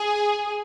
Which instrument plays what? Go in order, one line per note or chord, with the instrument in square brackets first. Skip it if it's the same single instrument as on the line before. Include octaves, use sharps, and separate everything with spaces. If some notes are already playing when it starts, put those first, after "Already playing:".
Already playing: [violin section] G#4